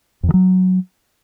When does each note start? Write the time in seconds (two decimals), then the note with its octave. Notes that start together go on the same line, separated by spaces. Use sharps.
0.23 F2
0.29 D#3
0.34 F#3